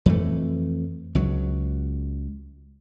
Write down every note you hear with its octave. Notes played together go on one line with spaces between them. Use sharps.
F2 E3 A3
C#2 F#3